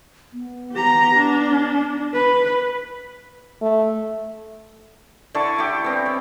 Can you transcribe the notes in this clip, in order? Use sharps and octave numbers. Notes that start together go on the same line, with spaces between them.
B3
G4 A#5
D4
B4
A3
D3 E4 A5 C#6
E4 G4
B3 C4
C#5